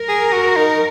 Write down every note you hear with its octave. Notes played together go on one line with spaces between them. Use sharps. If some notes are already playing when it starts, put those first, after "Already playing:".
Already playing: A#4
G#4
F#4
D#4